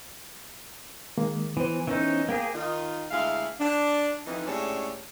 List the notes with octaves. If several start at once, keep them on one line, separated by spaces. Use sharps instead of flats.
D#3 G#3 A#3
E3 B3 C5
E3 C#4 D#4
A#3 G4 G#4
D#3 D#4 F4
D2 G#3 E4 F5
D4
F2 E3 D#4
A2 G#3 C#4 D4 G4 C#5